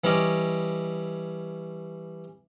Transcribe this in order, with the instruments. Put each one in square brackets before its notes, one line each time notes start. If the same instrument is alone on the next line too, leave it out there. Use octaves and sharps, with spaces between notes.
[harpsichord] E3 G3 C#4 D#5 D6